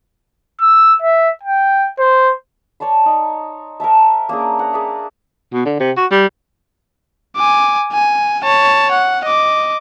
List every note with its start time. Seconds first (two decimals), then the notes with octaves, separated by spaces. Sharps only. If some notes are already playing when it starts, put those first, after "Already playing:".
0.61 E6
1.02 E5
1.43 G5
1.99 C5
2.80 C#5 D5 A5 C6
3.06 D#4
3.80 A#4 C#5 E5 A5
4.29 A#3 C#4 D4 G#4
4.59 F#5 A#5
4.73 G#4 D5 E5
5.53 B2
5.65 D3
5.80 C3
5.97 F#4
6.11 G3
7.36 G#5 D6
7.93 G#5
8.43 C#5 A5
8.91 F#5
9.25 D#5 D6